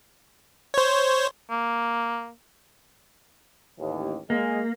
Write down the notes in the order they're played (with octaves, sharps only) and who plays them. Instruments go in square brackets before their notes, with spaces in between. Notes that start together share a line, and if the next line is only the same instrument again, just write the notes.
[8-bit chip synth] C5 C#5
[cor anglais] A#3
[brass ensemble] A1 D#2
[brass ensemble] G#3 [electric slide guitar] A#3